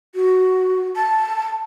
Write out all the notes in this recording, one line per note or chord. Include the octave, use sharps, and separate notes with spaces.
F#4
A5